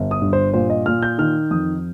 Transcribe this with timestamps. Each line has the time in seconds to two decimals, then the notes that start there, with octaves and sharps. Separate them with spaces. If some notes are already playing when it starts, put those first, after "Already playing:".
Already playing: G1
0.11 D#6
0.22 G2
0.33 C5
0.54 A#2 C5
0.70 D#5
0.86 A#2 F6
1.03 G6
1.18 D#3 F6
1.51 F2 D#6